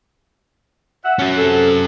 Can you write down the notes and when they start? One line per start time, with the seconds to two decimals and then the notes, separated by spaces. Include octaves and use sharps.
1.04 E5 F#5
1.19 F#3 C#4
1.37 C3 A4